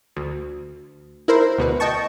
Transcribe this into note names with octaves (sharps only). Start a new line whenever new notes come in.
D2
E4 A#4 C5
D2 B2 B4
D#5 G5 A5 C#6